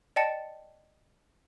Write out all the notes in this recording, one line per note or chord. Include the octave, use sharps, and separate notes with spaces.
D5 D#5 G5 A5 A6 C#7